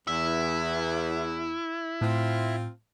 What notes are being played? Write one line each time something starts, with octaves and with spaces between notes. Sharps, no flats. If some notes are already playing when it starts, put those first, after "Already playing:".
E2 E4
A2 C4 F4